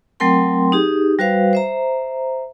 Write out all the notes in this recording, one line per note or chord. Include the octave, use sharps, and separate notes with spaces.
F#3 A3 C4 A#4 G5 C6
D#4 G4 G#4
G3 F#4 B4 C5 F5
C5 E5 A#5